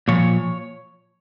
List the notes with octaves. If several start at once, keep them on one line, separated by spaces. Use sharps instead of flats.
A#2 F3 C#5